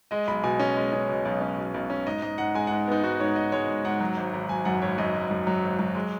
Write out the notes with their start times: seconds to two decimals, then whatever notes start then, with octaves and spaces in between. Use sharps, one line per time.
0.11 G#3 D#5
0.28 B1 B5
0.44 B2 G#5
0.59 C#4 D#5
0.77 G#3
0.93 C#4
1.09 B2
1.25 B1
1.41 C#4
1.58 B1
1.74 B1
1.90 C#4
2.07 G#2 D#5
2.22 G#2 D#5
2.38 G#2 F#5
2.54 G#3 G#5
2.67 G#2 F#5
2.87 B3 D#4
3.03 G#2 F#4
3.20 G#2 C#5
3.36 G#2 D#5
3.52 G#3 C#5
3.68 G#2
3.85 G#2 F#5
4.00 F#3
4.17 G#1
4.34 G#1
4.49 F#3 G#5
4.65 F#2 F#5
4.82 G#1 C#5
4.98 F#2 D#5
5.15 G#1
5.31 F#2
5.47 F#3
5.64 G#1
5.79 F#3
5.95 G#3